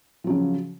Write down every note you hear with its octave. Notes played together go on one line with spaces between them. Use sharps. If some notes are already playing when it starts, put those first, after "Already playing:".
C#3 F3 F#3